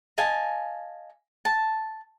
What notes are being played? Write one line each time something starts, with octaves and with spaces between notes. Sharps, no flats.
D#5 F5 G#5 A5
A5